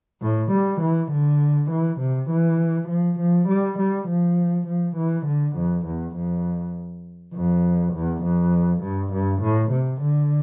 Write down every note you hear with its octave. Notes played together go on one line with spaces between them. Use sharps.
A2
G3
E3
D3
E3
C3
E3
F3
F3
G3
G3
F3
F3
E3
D3
F2
E2
F2
F2
E2
F2
G2
G2
A2
C3
D3